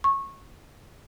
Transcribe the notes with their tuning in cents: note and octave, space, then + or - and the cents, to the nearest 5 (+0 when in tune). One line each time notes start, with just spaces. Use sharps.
C#6 -20